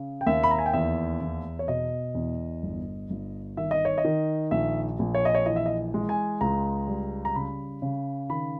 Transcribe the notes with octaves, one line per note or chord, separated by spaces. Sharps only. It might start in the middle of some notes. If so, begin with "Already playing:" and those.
Already playing: C#3
G5
D#2 E5
B5
A#5
G#5
G5
E2 E5
E2
C#5
B2 D#5
E2
G1
G1
D#3 E5
D#5
C#5
D#5
D#3
A#1 E5
A#1
C#5
D#5
C#5
E3 D#5
E5
D#5
G#3
G#5
C#2 A#5
G3
A#5
C#3 B5
C#3
D#3 B5